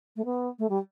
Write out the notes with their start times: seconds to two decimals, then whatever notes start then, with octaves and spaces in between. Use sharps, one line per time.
0.16 A3
0.25 B3
0.59 A3
0.69 G3